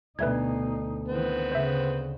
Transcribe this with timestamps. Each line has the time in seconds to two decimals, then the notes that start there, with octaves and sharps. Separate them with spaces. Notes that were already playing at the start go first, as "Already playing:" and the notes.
0.19 D2 B2 D#4 B4 E5 G#6
1.08 D#3 E3 B3 C4
1.52 C#3 C5 E5